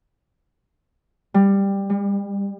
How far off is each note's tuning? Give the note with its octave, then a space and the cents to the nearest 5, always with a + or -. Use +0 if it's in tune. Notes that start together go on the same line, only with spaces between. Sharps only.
G3 +10
G3 +40